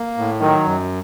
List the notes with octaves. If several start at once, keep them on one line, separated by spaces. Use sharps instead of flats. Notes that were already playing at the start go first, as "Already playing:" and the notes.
Already playing: A#3
A2
D#3 F#3
F#2